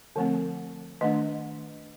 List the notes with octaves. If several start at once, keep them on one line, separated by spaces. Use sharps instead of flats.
D3 F3 A3 C4
D#3 A3 D4 D#5